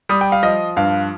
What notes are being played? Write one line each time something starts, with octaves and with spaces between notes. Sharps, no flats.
G3 D#6
G5
F5
F3 D#5
G2 F5